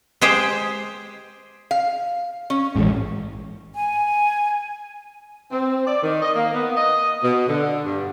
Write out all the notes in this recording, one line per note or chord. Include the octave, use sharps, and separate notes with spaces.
G#3 G4 G#4 C5 G5
F5
C#4
A1 G#2
G#5
C4
D5
D#3
D#5
A#3
B3
D#5
B2
D3
G2